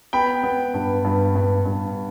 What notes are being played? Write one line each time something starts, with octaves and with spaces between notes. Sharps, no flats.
B3 G5 B5
B3
G2
G2
G2
G2